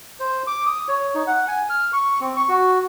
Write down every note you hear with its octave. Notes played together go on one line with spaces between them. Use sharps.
C5
D6
D#6
C#5
D#4
F#5
G#5
F6
C#6
C4
C#6
F#4